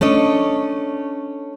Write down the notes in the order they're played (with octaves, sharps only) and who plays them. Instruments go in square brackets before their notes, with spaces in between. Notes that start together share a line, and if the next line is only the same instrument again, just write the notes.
[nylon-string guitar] A3 C#4 D4 D#5